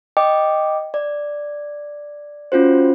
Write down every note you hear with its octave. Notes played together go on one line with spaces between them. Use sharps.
D#5 G5 D6
D5
C#4 F4 F#4 C5